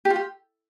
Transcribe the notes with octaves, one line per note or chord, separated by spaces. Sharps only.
G4
F4
G4